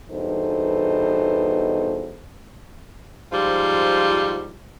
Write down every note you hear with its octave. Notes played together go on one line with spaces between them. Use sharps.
E2 G2 B2 D#4 A4 C5
G#2 F3 G3 F4 G4